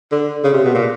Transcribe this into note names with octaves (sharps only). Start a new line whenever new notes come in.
D3
C#3
C3
B2
A#2